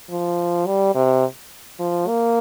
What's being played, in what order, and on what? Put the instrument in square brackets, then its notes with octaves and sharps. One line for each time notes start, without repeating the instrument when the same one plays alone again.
[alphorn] F3
G3
C3
F3
A#3